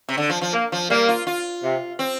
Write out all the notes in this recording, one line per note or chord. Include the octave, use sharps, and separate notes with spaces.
C3
D3
F3
F3
A#3
F3
G3 A#3
F4
F4
C3
C4